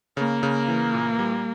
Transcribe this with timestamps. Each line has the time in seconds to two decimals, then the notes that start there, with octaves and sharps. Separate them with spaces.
0.17 C#3 A#3
0.43 C#3
0.68 E3
0.94 A#2
1.19 G3